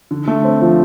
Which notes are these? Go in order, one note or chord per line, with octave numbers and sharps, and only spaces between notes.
D3
A3
C4
F3